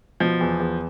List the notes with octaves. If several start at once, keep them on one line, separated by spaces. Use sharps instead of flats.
B2 F3
E2
E2